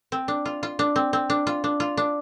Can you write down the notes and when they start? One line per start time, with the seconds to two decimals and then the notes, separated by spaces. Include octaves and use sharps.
0.12 C4
0.28 D4
0.45 F4
0.63 F4
0.79 D4
0.96 C4
1.13 C4
1.30 D4
1.47 F4
1.64 D4
1.80 F4
1.97 D4